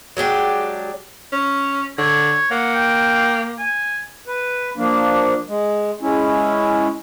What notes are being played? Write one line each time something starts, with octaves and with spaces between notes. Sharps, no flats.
F#3 G#3 D4 G4
C#4
D3 C#5
A#3 F#5
G5
G#5
B4
F3 A#3 D4
G#3
G#3 C#4 E4